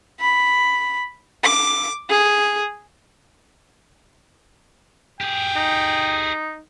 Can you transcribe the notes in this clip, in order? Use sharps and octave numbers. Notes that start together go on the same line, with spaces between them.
B5
D6
G#4
G4 G#4 G5
D#4